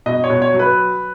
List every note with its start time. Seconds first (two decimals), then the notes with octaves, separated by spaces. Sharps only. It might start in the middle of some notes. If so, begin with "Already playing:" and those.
0.06 B2 D#5
0.24 C#5
0.30 B2
0.42 C#5
0.54 F#3
0.59 B4